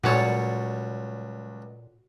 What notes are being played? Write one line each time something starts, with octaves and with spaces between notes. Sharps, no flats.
C#2 A#2 F#3 G3 F#4 A4 C#5